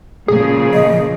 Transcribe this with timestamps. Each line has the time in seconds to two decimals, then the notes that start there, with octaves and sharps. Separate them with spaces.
0.28 A#2 C#3 F3 G#4
0.74 D#5